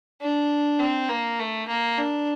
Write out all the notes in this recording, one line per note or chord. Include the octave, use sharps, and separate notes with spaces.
D4
C4
A#3
A3
A#3
D4